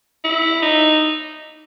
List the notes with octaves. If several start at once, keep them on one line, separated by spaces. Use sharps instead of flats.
E4
D#4